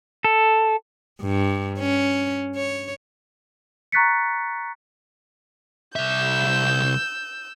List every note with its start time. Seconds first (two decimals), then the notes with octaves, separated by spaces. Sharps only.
0.24 A4
1.21 G2
1.79 C#4
2.56 C#5
3.92 A#5 C#6 F#6 A6 B6 C#7
5.96 C2 E5 E6 G6